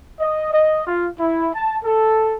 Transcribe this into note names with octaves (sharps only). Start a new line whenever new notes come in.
D#5
D#5
F4
E4
A5
A4